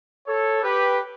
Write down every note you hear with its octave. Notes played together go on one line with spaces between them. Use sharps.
A4 C#5
G4 B4